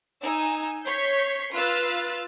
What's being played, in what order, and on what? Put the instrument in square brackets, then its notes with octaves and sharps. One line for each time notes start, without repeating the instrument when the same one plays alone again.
[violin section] D#4 G#5 E6
C#5 C#6 G6 B6 C7
F4 B4 F5 E6 F#6 A6